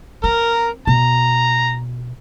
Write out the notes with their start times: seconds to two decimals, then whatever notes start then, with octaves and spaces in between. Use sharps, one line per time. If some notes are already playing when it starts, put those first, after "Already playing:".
0.24 C4 A#4
0.87 B2 A#5